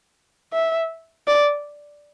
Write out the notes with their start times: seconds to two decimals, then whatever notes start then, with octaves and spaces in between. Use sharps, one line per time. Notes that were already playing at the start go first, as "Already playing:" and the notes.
0.53 E5
1.27 D5